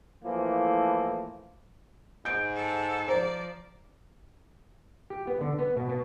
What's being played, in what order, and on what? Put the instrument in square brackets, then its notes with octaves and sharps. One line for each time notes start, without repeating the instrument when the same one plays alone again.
[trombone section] A2 E3 F3 A3 A#3
[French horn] G#2 [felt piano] G6 D7
[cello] A4
[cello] F3 D5 [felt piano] C5 A#5
[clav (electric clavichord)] G4
B3
D3
B3
B2
B2